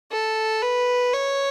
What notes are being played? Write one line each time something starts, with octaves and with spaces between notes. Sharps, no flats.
A4
B4
C#5